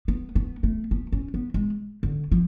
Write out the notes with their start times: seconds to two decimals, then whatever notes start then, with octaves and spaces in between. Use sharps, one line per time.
0.08 B3
0.35 B3
0.63 A3
0.91 B3
1.12 C#4
1.34 B3
1.54 G#3
2.03 D3
2.32 F3